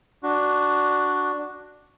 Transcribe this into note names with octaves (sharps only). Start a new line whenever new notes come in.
D4 F#4